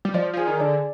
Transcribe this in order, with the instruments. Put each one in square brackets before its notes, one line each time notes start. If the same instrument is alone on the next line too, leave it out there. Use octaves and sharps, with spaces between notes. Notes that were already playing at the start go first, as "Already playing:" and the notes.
[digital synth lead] G3
[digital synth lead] F3 [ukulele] D5
[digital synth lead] F3 [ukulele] G#4
[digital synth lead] D#3
[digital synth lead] D3 [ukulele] D5